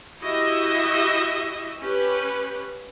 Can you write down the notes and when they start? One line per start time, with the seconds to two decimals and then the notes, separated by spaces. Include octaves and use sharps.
0.22 E4 F#4 G4 D#5 E5
1.82 C#4 G4 B4